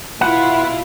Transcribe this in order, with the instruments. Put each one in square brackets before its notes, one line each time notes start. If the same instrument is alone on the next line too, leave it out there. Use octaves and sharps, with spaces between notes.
[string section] B2 E4 F4 [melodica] B4 [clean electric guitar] F#5